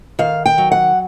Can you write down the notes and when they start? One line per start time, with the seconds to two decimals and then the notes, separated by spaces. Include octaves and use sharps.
0.19 D#3 F5
0.46 G5
0.58 F#3
0.72 F#5